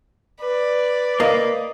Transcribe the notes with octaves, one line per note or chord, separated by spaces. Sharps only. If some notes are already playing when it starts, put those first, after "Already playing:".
B4 D5
A#3 D#5